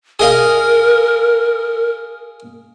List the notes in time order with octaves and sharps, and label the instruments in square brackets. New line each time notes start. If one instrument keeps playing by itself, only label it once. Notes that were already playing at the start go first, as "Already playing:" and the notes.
[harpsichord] G#4 D#5 F5 [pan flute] A#4